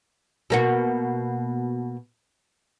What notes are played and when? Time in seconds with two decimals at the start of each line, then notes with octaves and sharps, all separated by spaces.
0.50 B2 A#3 F#4